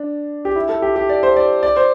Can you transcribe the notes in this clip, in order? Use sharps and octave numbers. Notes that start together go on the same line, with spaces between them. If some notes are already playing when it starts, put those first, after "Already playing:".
Already playing: D4
G4
E4
A4
G4
G4
D5
C5
D5
D5
C5